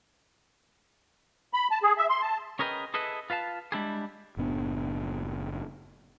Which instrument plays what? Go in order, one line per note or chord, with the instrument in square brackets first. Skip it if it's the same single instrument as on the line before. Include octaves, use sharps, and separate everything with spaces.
[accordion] B5
A5
G#4
E5
C6
A5
[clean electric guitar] C#4 G#4 A#4 B4 D#5 G5
E4 G#4 A4 B4 D#5
F4 B4 F5 A5
G3 G#3 D4 E4 G4 G#4
[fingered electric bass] F#1 A2 B3 D4